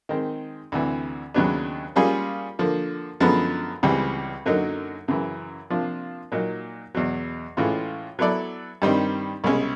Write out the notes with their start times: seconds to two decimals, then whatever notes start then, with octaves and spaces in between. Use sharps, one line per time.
0.09 D#3 G#3 C4
0.72 D2 C3 E3
1.34 D#2 C#3 F#3 B3 D4
1.96 G3 A#3 C#4 F4 G#4
2.59 D3 F3 A#3
3.20 F#2 D3 F3 G#3 B3
3.83 C#2 C#3 E3 G3 C4
4.46 F#2 D3 F#3 A#3 D#4
5.08 F#2 C#3 E3
5.70 C3 F3 A#3 D4 F4
6.32 A#2 F#3 A#3 D#4
6.95 E2 B2 F#3
7.57 A2 E3 G#3 C#4 F4
8.19 F#3 B3 E4 A4 D5
8.82 G2 D#3 G3 C4 D#4
9.44 C2 B2 G#3 C#4